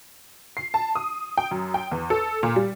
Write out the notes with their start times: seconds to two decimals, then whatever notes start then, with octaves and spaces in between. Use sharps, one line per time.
0.57 C7
0.74 A5
0.95 D#6
1.38 G5
1.51 F#2
1.74 G5
1.91 E2
2.10 A4
2.43 A#2
2.56 G3